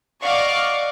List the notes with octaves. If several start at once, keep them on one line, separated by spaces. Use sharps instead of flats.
D5 D#5 F5 F#5 C#6 D6